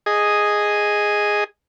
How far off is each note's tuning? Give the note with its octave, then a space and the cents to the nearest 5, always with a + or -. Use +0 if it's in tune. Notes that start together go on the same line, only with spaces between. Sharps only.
G#4 +0 D#5 +0